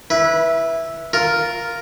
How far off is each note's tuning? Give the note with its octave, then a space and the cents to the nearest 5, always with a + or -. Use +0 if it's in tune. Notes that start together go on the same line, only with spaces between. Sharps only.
E4 +0 B4 -25
F4 +0 A#4 +0